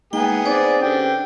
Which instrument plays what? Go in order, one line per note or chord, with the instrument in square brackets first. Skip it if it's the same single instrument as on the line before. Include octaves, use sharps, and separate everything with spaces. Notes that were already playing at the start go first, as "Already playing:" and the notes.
[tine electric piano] G#3 A#3 D#4 [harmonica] B3 G#4 [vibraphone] G5
[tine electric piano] C4 D#4 [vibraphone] C5 [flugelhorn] D5
[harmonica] D3 [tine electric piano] C#4 G4 B4 [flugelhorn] G5